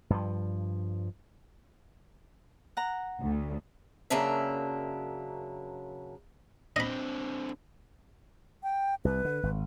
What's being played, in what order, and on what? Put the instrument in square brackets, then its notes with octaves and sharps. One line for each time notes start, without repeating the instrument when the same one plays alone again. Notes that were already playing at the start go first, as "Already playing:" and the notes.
[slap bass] G2 F3
[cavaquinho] F#5 A#5
[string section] D2
[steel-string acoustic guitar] F#2 C#3 F#3 A#3 D4 E5
[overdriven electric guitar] D3 C4 [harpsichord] D#5 B5
[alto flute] G5
[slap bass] C2 [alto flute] B4
[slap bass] D3
G#1